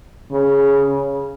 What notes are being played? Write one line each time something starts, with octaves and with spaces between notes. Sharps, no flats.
C#3